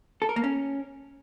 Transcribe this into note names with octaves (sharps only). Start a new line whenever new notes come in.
A4
A#4
A#3
C#4